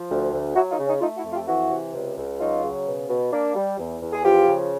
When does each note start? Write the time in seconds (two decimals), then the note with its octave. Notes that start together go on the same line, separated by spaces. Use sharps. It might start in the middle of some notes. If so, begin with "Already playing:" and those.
Already playing: F3
0.10 D2
0.33 D2
0.55 F#3 E4 F#4
0.71 D#4 F4
0.79 C#3
0.86 C#4 D#4
1.01 A3 D#4 F4
1.17 E4 F#4
1.25 F2
1.33 F4 G4
1.48 E3 E4 F#4
1.71 C3
1.95 C#2
2.17 C#2
2.40 F#3 D#4 F4
2.63 C#3
2.87 B2
3.09 B2
3.32 A#3 D4
3.56 G3
3.79 E2
4.02 E2
4.13 G#4
4.24 F3 F4 G4
4.48 C#3